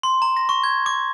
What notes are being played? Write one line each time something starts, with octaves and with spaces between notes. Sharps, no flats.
C6
A#5
A#6
C#6
G#6
D6